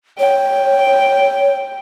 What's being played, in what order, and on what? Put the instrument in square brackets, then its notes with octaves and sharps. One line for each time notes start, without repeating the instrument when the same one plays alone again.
[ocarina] C#5 [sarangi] G5